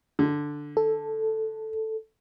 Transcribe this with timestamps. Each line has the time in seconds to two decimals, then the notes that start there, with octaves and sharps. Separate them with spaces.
0.19 D3
0.77 A4